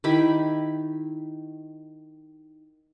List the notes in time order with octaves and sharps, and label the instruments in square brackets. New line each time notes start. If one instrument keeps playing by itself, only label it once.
[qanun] D#3 E4 G4 B5